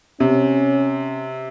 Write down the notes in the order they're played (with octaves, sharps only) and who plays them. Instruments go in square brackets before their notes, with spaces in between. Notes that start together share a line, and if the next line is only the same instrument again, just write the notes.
[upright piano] C3 [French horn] C#4